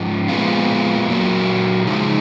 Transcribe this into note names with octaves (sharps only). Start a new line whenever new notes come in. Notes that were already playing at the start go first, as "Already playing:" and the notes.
Already playing: G#2 F3
A#2 F3 G#3 B3 F4
A#2 F#3 A#3
C#3 F3 G#3 D#4